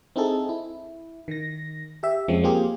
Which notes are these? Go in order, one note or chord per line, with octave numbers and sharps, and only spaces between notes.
C4 D#4 E4 G#4 A4
E4
D#3 A#6
G4 E5
F2 F3 G#3 C4 C#4
A#3 C4 F4 G4 G#4